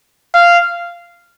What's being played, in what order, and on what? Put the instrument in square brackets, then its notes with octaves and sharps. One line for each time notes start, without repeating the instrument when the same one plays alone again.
[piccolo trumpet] F5